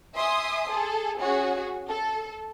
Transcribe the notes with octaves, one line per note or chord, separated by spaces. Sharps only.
E5 G#5 C6 D#6
G#4 A4
C#4 F#4 G#4
A4